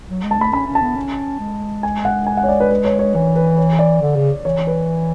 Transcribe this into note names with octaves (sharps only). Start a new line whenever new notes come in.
F#3
G#3
A5
A3 B5
C#4 B5
C#4
A5
B3
C#4
G#3
G#5
F#5
G#5
F#5
C#5
D5
B4
B4
C#5
C#5
E3 C#5
B4
C#5
D5
D3
C#3
E3 C#5
B4